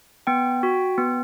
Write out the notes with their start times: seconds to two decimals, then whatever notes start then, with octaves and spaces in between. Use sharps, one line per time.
0.27 B3 G5
0.63 F#4
0.98 B3